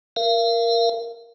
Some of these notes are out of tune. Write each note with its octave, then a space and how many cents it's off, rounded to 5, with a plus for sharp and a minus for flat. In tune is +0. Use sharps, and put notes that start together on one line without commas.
A#4 +0 F5 -40